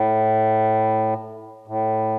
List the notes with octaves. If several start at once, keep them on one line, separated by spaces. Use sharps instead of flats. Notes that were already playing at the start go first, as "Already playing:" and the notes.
Already playing: A2
A2